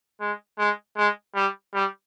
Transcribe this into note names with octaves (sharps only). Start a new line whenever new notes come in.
G#3
G#3
G#3
G3
G3